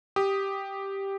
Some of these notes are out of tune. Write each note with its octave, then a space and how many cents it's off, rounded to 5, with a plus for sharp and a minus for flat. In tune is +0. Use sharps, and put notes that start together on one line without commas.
G4 +0 D#6 +0